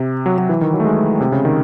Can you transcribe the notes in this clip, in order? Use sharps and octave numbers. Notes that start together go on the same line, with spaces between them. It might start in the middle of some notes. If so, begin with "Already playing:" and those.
Already playing: C3
F#3
F#3
E3
D#3
F#3
A3
G#3
C3
C#3
D#3